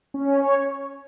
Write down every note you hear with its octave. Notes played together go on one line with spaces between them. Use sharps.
C#4
C#5